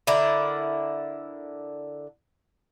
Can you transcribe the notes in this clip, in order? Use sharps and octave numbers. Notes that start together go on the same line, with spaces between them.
D3 E4 A#4 D5